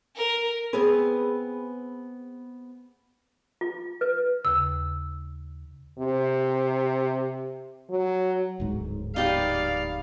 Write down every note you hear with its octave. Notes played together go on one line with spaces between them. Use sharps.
A#4
B3 C4 G#4 B4
F4
B4
D#2 C#3 E6
C3
F#3
D1 G#2
D#4 G4 B4 D5 F5